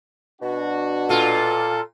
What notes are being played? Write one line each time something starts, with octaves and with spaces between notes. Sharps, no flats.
B2 D4 F#4
A#2 F4 A4